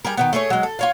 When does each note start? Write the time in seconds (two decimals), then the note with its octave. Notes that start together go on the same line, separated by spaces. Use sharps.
0.05 G3 G#4 A#4
0.17 D#3 F#3 B3
0.33 A3 G#4 A#4 C#5
0.50 F#3 G#3
0.63 A4
0.79 F4 C#5 F5